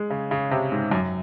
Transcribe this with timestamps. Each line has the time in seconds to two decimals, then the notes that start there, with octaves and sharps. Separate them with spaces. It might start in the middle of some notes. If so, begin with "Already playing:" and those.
Already playing: G#3
0.10 C#3
0.31 C#3
0.51 C3
0.72 G#2
0.91 F#2